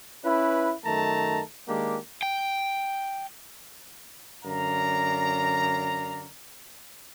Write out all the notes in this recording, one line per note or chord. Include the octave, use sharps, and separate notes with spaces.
C#4 E4 B4
F#2 D#3 A3 A5 A#5
D#3 G#3 A#3 D4 G4
G5
F#2 D3 D5 F5 A#5